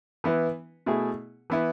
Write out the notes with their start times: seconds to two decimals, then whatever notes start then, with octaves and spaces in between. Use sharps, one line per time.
0.24 E3 B3 E4 B4
0.86 B2 A3 E4 G#4
1.50 E3 B3 E4